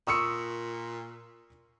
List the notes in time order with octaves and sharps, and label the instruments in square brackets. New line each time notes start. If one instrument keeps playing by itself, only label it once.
[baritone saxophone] A#2 [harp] C#6 [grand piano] D#6 E6 C#7